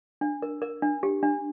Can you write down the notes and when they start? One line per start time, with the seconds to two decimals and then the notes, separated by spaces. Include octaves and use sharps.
0.21 D4
0.42 A#4
0.62 A#4
0.82 D4
1.03 G4
1.23 D4